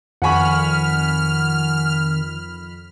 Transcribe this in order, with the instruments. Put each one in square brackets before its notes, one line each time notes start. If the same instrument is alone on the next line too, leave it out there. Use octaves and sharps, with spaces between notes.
[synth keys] F2 B5 [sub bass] D#3 [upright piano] F#5 G#5 C#6 [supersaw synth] F6